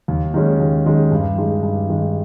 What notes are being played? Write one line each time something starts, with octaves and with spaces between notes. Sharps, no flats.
D#2
D#3 G#3 C#4
D#2
D#3 G#3 C#4
G2
D#3 G#3
G2
D#3 G#3